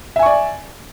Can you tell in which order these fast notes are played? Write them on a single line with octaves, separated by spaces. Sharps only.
E5 G#5 C#6 D5